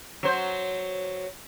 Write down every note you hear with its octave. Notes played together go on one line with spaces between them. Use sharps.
F#3 C5